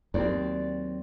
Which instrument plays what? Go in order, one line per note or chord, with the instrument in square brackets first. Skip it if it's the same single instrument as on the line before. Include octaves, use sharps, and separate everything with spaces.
[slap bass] D#2 [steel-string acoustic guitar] F#3 C4 D5